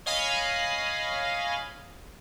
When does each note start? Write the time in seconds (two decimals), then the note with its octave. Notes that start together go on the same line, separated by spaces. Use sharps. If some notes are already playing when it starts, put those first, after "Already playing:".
0.06 C#5 D#5 F5 G#5 B5